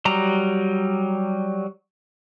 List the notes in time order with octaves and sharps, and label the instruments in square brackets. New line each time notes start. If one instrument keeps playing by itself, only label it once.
[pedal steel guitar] F#3 G3 A#5